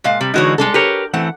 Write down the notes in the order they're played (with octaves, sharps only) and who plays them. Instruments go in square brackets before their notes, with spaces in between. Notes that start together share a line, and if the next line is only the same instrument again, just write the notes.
[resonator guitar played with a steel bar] A#2 G#3 F5
[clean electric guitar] C3 [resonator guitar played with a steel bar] G3
[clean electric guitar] D3 E3 G#3 [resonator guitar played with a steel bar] D#4 F#4 C#5
[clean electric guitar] C2 [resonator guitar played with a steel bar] G#3 D4 A4
[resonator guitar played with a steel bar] G4 A#4 [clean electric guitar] B4 C#5
[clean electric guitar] E3 A3 C4 [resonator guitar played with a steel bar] F#5